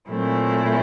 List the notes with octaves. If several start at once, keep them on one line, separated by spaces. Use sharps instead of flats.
A#2 F#3 A3 C4 E4